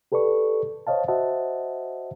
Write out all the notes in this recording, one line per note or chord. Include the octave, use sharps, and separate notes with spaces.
G4 A4 B4 D5 C#6
C5 C#5 D#5 F5 A5
F#4 C5 D#5 E5 F#5 A5